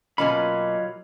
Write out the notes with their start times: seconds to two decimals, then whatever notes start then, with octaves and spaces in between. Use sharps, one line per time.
0.18 B2 F#3 A#3 C#4 F4 D#5 B5